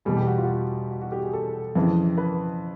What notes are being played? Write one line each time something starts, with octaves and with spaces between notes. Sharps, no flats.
E2 B2 G3 G#4
G4
F#4
F4
F#4
F4
F#4
F#4
G4
G#4
A4
F2 C#3 E3
B4